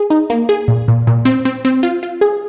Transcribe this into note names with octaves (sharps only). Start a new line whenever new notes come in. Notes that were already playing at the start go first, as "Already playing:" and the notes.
Already playing: G#4
D#4
A#3
G#4
A#2
A#2
A#2
C4
C4
C4
F4
F4
G#4